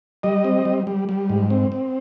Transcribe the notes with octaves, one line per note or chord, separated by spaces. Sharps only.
G3 D#5
C4
G3
G3
G3
G#2
C4
C4